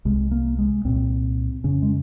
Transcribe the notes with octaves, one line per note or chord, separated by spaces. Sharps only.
C2 C3 G#3
A#3
G#3
C2 A#2 C4
F2 C#3 C#4
G#3